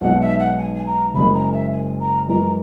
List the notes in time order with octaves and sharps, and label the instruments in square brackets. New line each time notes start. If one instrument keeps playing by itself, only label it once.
[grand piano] B1 B2 G#3 D#4 [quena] F#5
[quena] E5
F#5
G#5
G#5
A#5
[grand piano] F#1 F#2 C#3 G#3 [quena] B5
[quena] A#5
E5
G#5
A#5
[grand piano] F#2 E3 G#3 [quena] A#5